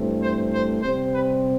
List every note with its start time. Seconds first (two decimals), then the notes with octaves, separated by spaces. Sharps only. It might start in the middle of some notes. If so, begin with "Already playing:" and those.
Already playing: G2 E3 A3 C4
0.21 C5
0.52 C5
0.82 C3 G3 C4 C5
1.12 B4